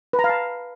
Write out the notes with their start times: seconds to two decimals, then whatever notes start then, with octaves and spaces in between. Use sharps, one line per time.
0.13 B4
0.19 A#5
0.24 F5
0.29 A5